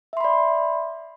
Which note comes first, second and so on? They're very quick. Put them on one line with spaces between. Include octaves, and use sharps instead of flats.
E5 C6 B5 D5